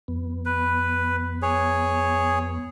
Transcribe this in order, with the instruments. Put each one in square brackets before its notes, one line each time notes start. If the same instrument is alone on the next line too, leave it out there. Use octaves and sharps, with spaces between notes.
[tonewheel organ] F2 B3
[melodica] B4
G#4 C#5